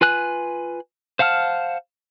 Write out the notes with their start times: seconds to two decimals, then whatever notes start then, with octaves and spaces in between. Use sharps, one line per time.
0.01 F4 B4 G#5 F#6
1.19 C5 F5 F#5 A5 F6